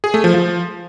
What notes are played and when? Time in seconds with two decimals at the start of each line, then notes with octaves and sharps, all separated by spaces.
0.04 G#4
0.14 A3
0.24 F3
0.34 F3